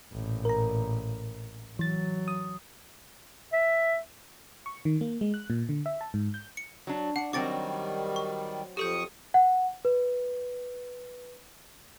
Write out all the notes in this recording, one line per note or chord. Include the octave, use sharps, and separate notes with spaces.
A1 A#2
A#4 A#5
E3 F#3 A6
D#6
E5
C#6
D#3
A#3
G#3
F#6
A#2
D3
E5
A5
G#2
G6
C#7
F#3 D4
D4 F#5 C#7
D#3 F#3 G3 C4 F#4 D6 A6 D7
C#6
F2 G4 A4 C#6 D#6 G6
F#5
B4